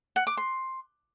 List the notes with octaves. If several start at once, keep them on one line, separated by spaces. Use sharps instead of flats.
F#5
D6
C6